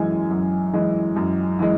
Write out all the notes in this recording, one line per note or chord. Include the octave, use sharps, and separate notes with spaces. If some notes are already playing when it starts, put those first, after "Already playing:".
Already playing: F#2 E3 G#3 G#5
F#2
E3 G#3
F#2
E3 G#3